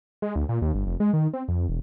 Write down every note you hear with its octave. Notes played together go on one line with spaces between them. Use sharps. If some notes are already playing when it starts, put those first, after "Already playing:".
G#3
D2
A#2
D#2
G1
F1
G#3
D#3
C4
F2
E1